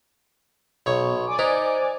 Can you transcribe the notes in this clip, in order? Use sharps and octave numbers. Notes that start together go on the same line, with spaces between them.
B1 B2 C#5
D5 G#5 D6
D#4 C5